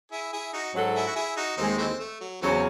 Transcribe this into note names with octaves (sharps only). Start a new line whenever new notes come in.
E4 G#4
E4 G#4
D#4 F#4
G#2 F#3 C#4 F#4 A4
E4 G#4
F#4
E4 G#4
D#4 F#4
D#2 D#3 G#3 C4 D#4
E3 A3 C4
A3
F#3
E2 C#3 E3 F#3 A3 C4 C#4